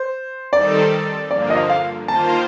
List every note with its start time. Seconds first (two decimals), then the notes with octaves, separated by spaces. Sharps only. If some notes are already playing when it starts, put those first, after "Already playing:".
Already playing: C5
0.53 D#3 G3 C4 D#4 A4 D5
1.30 G2 D3 F3 A#3 D5
1.50 D#5
1.70 F5
2.08 D#3 A#3 F4 C5 A5